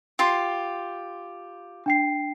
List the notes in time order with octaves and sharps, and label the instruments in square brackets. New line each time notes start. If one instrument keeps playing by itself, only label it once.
[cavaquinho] F4 G4 C6
[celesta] D4 G5 C7